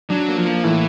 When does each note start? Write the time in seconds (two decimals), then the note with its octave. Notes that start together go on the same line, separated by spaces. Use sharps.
0.10 F#3 D4
0.28 A#3
0.37 F3
0.45 A#3
0.64 A2 E3